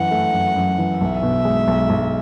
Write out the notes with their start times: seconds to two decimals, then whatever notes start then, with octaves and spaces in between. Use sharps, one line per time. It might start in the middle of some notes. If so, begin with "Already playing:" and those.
Already playing: F#2 E3 F#5
0.11 A3
0.33 F#2
0.56 F#2
0.78 E3
1.01 B1 E5
1.23 B2
1.45 G#3
1.68 B1
1.90 B1